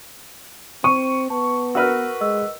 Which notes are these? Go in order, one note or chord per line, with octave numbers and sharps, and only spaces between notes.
C4 C#6 D#7
B3 A5
F#4 A#4 B4 E6 F6
G#3 D#5 E6